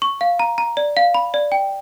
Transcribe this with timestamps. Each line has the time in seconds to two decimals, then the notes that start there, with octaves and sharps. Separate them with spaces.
0.02 C#6
0.21 F5
0.39 A#5
0.58 A#5
0.77 D5
0.97 F5
1.14 B5
1.34 D5
1.52 G5